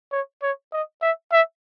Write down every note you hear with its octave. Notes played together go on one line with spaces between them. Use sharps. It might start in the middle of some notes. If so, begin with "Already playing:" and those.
C#5
C#5
D#5
E5
E5